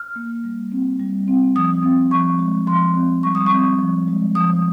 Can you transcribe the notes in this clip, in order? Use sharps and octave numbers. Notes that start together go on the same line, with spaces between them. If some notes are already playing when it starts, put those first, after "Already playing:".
Already playing: F6
A#3
G3
C4
G3
C4
F3 D#6
C4
F3 C#6
G#3
F3 C6
C4
G3 C#6
D#6
C#6
C4
F3
G#3
F3 D#6